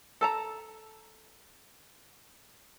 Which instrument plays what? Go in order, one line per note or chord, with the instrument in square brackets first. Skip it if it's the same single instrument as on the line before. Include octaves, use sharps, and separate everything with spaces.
[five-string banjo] A4 A5 A#5